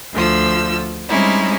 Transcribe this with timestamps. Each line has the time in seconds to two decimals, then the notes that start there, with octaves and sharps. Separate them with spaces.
0.12 D2 F3 E6
1.08 G3 G#3 C4 C#4 D#4 E4